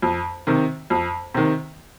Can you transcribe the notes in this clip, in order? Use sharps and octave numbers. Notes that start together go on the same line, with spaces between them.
F2
C3 D#3
F2
C3 D#3